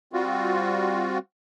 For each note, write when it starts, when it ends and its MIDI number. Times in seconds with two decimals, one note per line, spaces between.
0.13 1.18 55
0.13 1.18 60
0.13 1.18 65
0.13 1.18 66